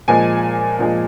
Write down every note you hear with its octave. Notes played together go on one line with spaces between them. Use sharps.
A#2 F3 G#3 G#5
A#2 F3 G#3